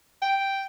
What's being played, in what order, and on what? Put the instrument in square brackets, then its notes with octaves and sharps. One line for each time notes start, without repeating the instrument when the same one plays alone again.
[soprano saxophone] G5